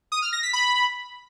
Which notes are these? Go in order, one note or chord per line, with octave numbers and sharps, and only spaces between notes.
D#6
F6
A#6
B6
B5